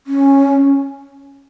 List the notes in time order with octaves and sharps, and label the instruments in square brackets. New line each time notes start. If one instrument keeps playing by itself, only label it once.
[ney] C#4